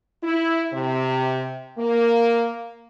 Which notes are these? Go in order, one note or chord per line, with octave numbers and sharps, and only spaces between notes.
E4
C3
A#3